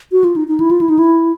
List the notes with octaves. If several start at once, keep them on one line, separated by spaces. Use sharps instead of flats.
F#4
F4
D#4
D#4
E4
F4
E4
D#4
E4